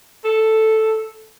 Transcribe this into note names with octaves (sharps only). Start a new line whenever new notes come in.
A4